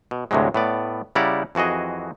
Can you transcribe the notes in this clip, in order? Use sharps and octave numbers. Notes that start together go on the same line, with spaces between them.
B2
D2 A2 C3 F#3 G#3
A2 B3 D5
C#3 G3 E4 D5 F#5 A#5
F2 E3 F#4 G#4 D#5